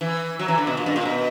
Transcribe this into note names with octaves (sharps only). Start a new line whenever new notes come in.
E3
F#3
E3
D3
B2
A#2
G2
A#2
B2